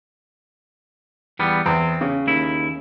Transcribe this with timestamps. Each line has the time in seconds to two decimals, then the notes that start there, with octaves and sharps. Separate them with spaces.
1.39 E2 G3 B3
1.66 E2 C4
2.01 C#3
2.27 D#2 E4